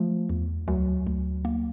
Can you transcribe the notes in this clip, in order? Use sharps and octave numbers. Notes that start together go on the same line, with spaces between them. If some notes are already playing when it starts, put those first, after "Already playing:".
Already playing: F3 A3
E2
D2 F#3
D2
A#3